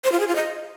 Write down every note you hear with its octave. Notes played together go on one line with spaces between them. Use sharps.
C5
F4
G#4
F4
D#5